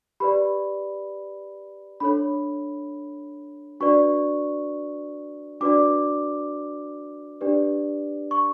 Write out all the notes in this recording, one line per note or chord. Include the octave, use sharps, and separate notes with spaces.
G4 B4 D5 B5
D4 A4 C#5 B5
D4 F#4 B4 D5 C#6
D4 F#4 B4 D5 D6
D4 G4 B4 D5
C#6